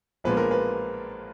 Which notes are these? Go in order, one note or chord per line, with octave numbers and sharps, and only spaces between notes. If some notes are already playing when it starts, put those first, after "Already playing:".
A#1 A#2 F3 G#3 B3 B4
A#4
B4